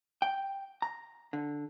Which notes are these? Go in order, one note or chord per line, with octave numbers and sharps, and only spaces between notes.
G5
A#5
D3